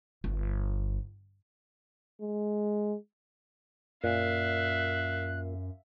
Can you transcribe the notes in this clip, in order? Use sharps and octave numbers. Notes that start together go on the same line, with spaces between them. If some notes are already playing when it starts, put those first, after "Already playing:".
G1
G#3
F#2 A#2 E5 F5 F#6